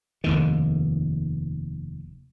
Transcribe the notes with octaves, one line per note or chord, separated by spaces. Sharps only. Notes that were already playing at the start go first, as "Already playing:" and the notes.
F1 D#2 D#3